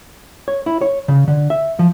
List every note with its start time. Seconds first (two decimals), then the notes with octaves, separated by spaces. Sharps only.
0.48 C#5
0.66 E4
0.81 C#5
1.08 C#3
1.28 D3
1.50 E5
1.79 F3